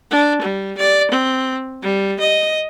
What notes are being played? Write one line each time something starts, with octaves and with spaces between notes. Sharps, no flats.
D4
G3
D5
C4
G3
D#5